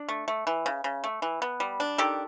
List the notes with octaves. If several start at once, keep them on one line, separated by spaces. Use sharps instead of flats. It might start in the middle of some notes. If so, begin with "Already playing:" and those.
Already playing: D4
A3
A3
E3
C#3
C#3
A3
E3
B3
G3
D4
D#3 G4 A4